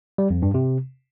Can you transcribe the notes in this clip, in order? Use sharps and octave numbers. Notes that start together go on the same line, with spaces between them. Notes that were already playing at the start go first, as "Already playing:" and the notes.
G3
F2
G2
C3